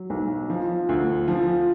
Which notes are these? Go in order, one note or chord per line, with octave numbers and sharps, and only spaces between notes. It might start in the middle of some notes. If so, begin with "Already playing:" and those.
Already playing: F#3
B1
F3
D2
F3